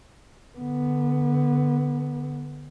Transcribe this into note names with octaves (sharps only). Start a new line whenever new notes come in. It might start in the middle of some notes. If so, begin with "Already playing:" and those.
D3 B3